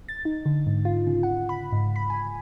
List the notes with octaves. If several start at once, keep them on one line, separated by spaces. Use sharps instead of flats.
A6
D#4
D3
G#2
F4
C#3
F#5
B5
G#2
B5
G#5